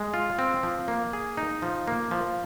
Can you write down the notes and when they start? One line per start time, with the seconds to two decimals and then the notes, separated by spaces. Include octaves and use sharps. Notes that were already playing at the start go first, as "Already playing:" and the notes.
Already playing: G#3
0.14 F4
0.39 C4
0.63 F3
0.88 A#3
1.13 G#4
1.37 D#4
1.62 F3
1.88 A#3
2.11 F3